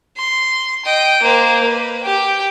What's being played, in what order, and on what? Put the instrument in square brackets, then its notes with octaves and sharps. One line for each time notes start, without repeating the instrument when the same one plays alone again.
[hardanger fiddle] C6
D#5 G5
A#3 C5
B4
G4 G5